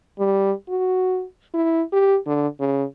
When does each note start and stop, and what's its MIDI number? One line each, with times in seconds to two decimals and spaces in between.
0.19 0.52 55
0.69 1.24 66
1.54 1.82 64
1.93 2.17 67
2.27 2.48 50
2.60 2.84 49